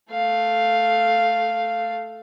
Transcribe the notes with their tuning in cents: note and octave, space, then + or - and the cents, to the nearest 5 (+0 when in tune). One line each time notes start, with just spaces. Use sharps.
A3 +0 F5 +0